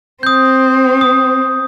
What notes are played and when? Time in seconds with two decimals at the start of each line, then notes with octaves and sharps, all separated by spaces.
0.23 C4 D#6 G6
1.01 D#6